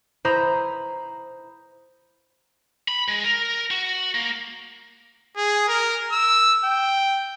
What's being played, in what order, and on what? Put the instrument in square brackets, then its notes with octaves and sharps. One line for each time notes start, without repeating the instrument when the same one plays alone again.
[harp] E4 C5 A#5 B5 D#6
[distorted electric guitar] B5
G#3
A#4
F#4
A#3
[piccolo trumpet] G#4
A#4
E6
G5